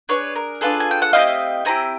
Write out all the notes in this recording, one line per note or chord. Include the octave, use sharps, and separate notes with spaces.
D4 F4 G#4 B4 C#5
A#4
D4 F4 G#4 A4 B4
G#5
G5
F#5
A3 C4 E4 G4 D#5 F5
A3 C4 E4 G4 G#5 A#5